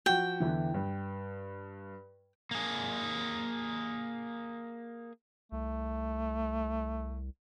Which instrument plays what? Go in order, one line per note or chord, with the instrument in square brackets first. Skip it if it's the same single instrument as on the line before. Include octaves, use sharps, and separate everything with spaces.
[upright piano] F3 F#4 [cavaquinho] G5
[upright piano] E2 D3 E3
G2
[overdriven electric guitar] A#3 G#4
[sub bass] C2 [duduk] A3